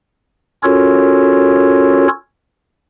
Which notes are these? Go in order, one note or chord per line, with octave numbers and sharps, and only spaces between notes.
C#4 F4 F#4 A4 A#4 C#5